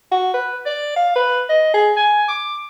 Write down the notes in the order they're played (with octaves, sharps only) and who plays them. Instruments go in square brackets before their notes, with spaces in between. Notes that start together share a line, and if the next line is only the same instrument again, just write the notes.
[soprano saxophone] F#4
B4
D5
F5
B4
D#5
G#4
G#5
D6